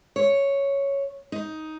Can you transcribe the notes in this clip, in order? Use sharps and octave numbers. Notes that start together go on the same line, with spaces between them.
C#5
D#4